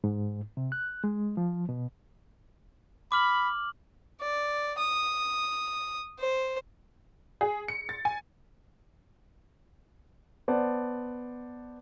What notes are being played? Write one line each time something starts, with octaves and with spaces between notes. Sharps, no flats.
G#2
C3
F#6
G#3
F3
B2
B5 D6 F6 F#7
D5
D#6
C5
G#4
C#7
A6
G#5
B3 C5 D5 F#5 A5